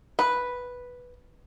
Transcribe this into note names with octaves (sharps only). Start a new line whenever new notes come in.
B4